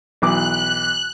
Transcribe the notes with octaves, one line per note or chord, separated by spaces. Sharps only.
B1 E3 D6 F#6